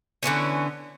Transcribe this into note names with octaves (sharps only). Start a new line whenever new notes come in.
D3 E3 B3 C#4